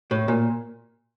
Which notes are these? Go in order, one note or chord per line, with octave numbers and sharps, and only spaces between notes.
A2
A#2